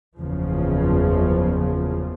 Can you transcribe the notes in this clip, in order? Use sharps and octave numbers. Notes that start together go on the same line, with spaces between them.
F#1 E2 C#3 F3